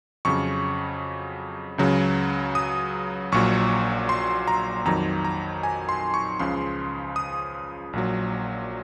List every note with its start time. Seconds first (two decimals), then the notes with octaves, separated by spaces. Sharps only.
0.25 F2 C#3 F#3 C#6
1.78 C#2 C#3 F#3
2.55 D#6
3.32 A#1 A#2 F#3 C#6
4.09 C6
4.48 A#5
4.85 F2 D#3 F#3 A#5
5.25 A#5
5.63 G#5
5.89 C6
6.14 C#6
6.39 C#2 C#3 F3 C6
7.16 D#6
7.93 A#1 A#2 F#3